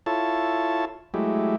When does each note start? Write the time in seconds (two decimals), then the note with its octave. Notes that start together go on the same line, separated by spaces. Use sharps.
0.06 E4 F4 A4 C#5 A5
1.14 F#3 G#3 A3 E4 G4